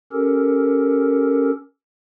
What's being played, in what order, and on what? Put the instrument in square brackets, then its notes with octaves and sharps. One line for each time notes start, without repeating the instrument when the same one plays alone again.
[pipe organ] C#4 G4 A4 A#4